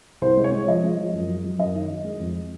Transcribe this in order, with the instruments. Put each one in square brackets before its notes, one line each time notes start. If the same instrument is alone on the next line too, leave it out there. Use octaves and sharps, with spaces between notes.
[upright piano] C2 C5
G#3
C#5
G#3
F3 D#5
G#3
F3
F#2
F#3
F#3
F#2 D#5
D#3
F#3
G#3
F2